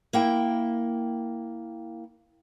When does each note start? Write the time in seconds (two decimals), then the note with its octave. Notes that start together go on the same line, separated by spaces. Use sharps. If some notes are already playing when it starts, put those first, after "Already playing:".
0.13 A#3 E4 G5